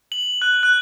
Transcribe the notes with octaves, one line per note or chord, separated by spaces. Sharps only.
F#7
F#6
F#6